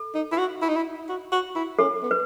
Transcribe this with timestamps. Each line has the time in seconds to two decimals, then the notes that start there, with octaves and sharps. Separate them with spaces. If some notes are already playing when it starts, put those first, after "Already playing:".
Already playing: A4
0.15 D#4
0.32 E4
0.38 F#4
0.62 E4
0.69 D#4
0.76 E4
1.09 F#4
1.32 F#4
1.56 E4
1.79 C#4 A4
2.03 B3
2.11 B4